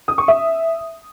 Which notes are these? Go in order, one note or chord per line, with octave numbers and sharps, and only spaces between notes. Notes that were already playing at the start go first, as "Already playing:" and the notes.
D#6
C#6
E5